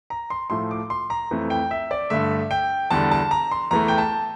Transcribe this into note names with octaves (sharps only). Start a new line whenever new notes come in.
A#5
C6
A2 F3 A3 C6
D6
C6
A#5
F2 E3 A3
G5
E5
D5
G2 D3 A3 E5
G5
E2 D3 G3 A5
A5
A#5
C6
E2 E3 A3 A#5
G5
A5